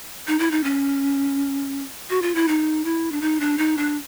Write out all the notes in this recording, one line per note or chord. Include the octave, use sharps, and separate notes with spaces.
D#4
E4
D#4
C#4
F#4
F4
E4
D#4
E4
D4
D#4
D4
D#4
D4